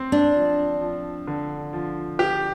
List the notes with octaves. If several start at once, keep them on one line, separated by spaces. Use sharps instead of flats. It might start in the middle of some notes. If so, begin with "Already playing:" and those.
Already playing: C4
D4
F3
F3
D3
F3
G4